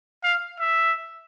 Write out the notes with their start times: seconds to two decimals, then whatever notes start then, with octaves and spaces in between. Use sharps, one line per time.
0.24 F5
0.60 E5